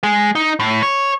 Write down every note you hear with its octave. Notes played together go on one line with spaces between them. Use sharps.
G#3
D#4
A2
C#5